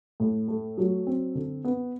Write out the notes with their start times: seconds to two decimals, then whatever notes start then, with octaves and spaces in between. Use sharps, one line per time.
0.20 A2
0.48 A3
0.78 F#3
1.07 C4
1.35 D3
1.65 B3